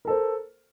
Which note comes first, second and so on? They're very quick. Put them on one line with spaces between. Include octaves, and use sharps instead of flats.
A#4 A4 C5